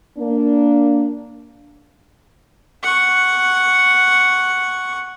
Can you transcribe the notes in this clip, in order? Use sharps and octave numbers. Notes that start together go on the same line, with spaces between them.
A#3 D4
F#5 C#6